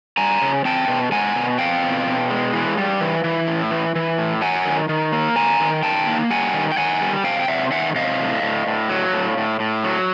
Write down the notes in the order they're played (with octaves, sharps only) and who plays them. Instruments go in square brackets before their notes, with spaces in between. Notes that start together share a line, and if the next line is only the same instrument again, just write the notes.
[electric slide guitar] G3 G#5 A#5
C#3
C4 G5 A5
B2
G#3 F#5 G#5
B2
C4 F5 G5
B2
B2
G#3
E3
G3
E3
E3
A2
E3
E3
A2
F#3 F#5 G#5
D#3
D#3
A#3
D#3 G#5 A#5
D#3
D#3 G5 A5
A#3
G3 F#5 G#5
D#3
G5
D#3 F#5 G#5
G3
C3 F5 G5
G5
C3 E5 F#5
D#3 E5 F#5
C3 D#5 F5
A2
A2
A2
F#3
A2
A2
A2
F#3